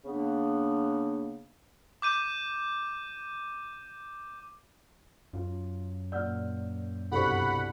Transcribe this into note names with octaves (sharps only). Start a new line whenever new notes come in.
C#3 A#3 B3 D4
D6 G6 D#7
F#2 F4
A#2 D5 F#5 E6 F6 G6
C2 G2 B2 A4 C5 F#5 B5 C#6